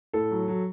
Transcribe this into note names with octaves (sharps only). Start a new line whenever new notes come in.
A2 A4
F#3
F#3